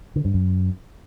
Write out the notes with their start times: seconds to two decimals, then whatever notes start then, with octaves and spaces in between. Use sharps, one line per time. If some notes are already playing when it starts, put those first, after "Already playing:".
0.16 D3
0.25 G2
0.34 F#2